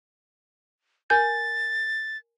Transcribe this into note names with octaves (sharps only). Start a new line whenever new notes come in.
A#4 G#5 G6 A6